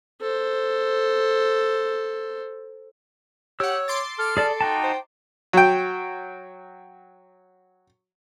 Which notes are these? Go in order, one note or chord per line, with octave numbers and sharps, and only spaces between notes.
A4 C5
G4 C#5 F#5 E6
C6 D6 A6
A4 F6
G#4 A4 D5 A5
D#4 F#4 G5 A5
C5
F#3 G5